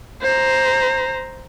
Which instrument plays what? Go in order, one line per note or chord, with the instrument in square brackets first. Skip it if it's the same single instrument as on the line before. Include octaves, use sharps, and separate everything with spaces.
[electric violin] C5 A#5